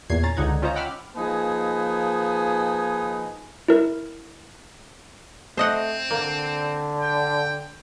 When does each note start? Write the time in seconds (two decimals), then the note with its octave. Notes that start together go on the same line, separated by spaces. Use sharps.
0.10 E2 A#2 G#6 C7
0.23 C#4 A#5 A6
0.37 C#2 D3 D#4 F#5 G#6
0.62 C#4 F4 C5 C#5 D#5 A#5
0.76 F#5 G5 B5 D6 E6 F6
1.16 F3 A#3 D#4 G#4 B4 G#5
3.68 E4 A#4
5.57 A3 C4 C5 D#5 F#5
6.10 D3 A#3
7.01 G5